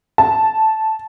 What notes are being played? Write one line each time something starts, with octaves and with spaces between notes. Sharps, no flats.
A5